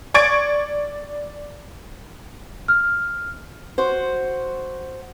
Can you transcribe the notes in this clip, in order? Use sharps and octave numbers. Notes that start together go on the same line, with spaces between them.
D5 C#6 G#6 A6 D7
F6
F#4 C5